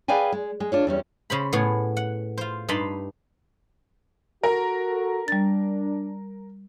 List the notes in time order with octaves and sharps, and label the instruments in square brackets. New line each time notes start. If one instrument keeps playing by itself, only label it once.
[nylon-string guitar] G#4 B4 D5 F5 G5 G#5
G#3
G#3
D4 F4 C#5
E2 G3 C#4
[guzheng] C#3 C5 B5
A2 B3 G#4 C#5
F#5
F4 C5
G2 D#4 A5 B5 C6
[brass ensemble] F#4 A4 [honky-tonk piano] A#4
[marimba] G3 A6 [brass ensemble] D4